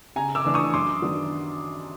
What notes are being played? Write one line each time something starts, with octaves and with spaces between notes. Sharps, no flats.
C#3 G#5 A#5
D6 E6
E3 A3 D4
C#6 D#6
F#2 C6 D6
D#3 F#3 B3 D4